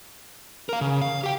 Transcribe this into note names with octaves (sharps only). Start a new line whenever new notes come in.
A#4 F5
C#3
F5
G4 G5